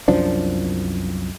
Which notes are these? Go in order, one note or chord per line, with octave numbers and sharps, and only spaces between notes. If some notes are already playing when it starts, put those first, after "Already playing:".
C2 F#2 F3 D4